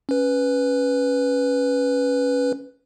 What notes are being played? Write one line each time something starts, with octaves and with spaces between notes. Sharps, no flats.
C#4 B4